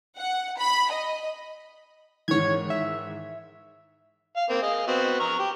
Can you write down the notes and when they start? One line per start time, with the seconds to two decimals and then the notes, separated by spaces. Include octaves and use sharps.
0.19 F#5
0.59 B5
0.91 D#5
2.28 G#2 D#3 E3 C#5 G#6
2.70 E5
4.36 F5
4.49 A#3 C4
4.62 G#4 D#5 F5
4.87 B3 C4 F#4
5.20 A#5 C#6 F6
5.39 G4